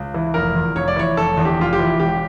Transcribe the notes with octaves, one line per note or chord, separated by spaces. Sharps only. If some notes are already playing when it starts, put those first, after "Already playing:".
Already playing: C#2
E3
F1 A#4
E2
F1 C#5
D5
E3 C#5
F1 A4
E2
G4
F1 F4
G4
E3
E1 G4